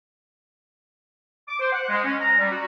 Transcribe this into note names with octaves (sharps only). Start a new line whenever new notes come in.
D6
C5
F#5
G#3
C#4
A#5
G3
F#4